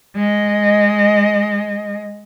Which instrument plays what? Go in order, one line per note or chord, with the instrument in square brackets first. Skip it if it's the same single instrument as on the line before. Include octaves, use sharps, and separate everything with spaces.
[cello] G#3 D#5